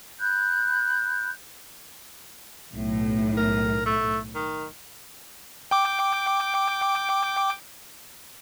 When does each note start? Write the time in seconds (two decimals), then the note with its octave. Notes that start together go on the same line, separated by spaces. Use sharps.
0.20 B5 F#6 G6
2.72 B1 A2
3.37 A#4
3.86 A3
4.35 D#3
5.71 G5 D6